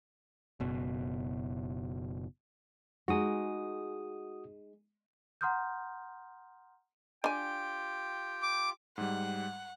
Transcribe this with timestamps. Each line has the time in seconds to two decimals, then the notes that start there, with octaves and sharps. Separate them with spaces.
0.60 F#1 B2
3.08 G#3 D#4 F#4 G#4 D#6
5.41 F#5 A#5 C6 D#6 F6 G6
7.24 D4 F4 G4 G5 G#5
8.42 D6
8.98 G#2 G3 F#5